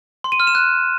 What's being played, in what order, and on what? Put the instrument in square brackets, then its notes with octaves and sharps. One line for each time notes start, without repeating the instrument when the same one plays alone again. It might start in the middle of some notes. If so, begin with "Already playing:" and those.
[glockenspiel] C6
D#7
F6
E7
F#6